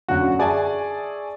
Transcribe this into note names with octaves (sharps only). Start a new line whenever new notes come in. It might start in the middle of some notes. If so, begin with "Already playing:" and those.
F#2 D3 F#4
G#4 D5 E5 G#5 A5 C#6